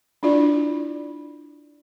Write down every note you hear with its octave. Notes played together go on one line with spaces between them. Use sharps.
D4 E4 F4 D5